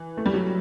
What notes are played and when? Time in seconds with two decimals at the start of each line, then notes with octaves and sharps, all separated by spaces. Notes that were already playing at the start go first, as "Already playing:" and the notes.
Already playing: E3
0.17 A3
0.26 G3
0.34 F#3